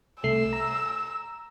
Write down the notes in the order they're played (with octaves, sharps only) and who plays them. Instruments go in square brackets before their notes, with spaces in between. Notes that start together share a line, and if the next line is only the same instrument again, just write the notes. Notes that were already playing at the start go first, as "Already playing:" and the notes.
[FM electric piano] C2 A3 C7 [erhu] E6
[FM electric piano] A#5